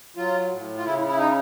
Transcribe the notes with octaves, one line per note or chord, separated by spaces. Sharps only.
F#3 F4
A2
F4
C#3 E4
E4
D#4